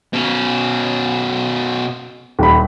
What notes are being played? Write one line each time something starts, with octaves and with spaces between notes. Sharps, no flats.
B2 C#4
D#1 B5